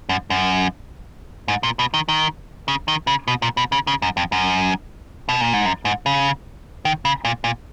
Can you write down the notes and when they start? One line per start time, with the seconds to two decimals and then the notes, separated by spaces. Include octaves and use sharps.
0.09 F#2
0.30 F#2
1.48 G#2
1.63 A#2
1.79 B2
1.94 D#3
2.09 D#3
2.68 C#3
2.88 D#3
3.07 C#3
3.28 B2
3.42 A#2
3.57 B2
3.72 C#3
3.87 C#3
4.02 F#2
4.17 F2
4.32 F#2
5.29 B2
5.41 A#2
5.53 G#2
5.66 F#2
5.85 G#2
6.06 C#3
6.85 D#3
7.05 C#3
7.25 A#2
7.44 A#2